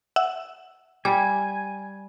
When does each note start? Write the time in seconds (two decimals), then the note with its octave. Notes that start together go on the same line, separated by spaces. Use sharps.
0.16 E5 F#5 E6
1.05 G3 G#5 D6